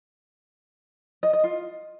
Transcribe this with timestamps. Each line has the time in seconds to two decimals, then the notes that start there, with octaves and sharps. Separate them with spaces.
1.23 D#5
1.33 D#5
1.44 F4